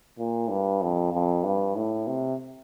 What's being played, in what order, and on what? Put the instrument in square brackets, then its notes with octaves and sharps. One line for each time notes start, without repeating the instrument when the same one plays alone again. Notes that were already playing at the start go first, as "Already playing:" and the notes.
[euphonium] A#2
G2
F2
F2
G2
A2
C3